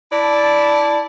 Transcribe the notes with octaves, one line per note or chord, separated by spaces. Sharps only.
E4 D5 A5